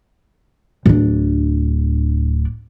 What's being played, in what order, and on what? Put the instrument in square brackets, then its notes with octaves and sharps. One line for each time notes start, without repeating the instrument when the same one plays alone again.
[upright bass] D1 D4